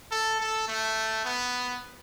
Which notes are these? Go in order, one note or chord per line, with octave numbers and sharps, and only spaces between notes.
A4
A4
A3
B3